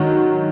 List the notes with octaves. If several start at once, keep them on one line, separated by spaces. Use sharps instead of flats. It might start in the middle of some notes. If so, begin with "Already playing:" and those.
Already playing: D#3 F#3